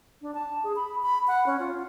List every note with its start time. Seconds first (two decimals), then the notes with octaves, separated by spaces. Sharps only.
0.22 D4
0.35 A5
0.64 G#4
0.76 B5
1.02 B5
1.27 F#5
1.46 C#4
1.59 F4